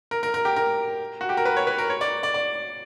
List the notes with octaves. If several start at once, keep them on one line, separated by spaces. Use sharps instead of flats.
A#4
A#4
A#4
G4
A#4
F#4
G4
A#4
B4
C#5
B4
A#4
C#5
D5
D5
D5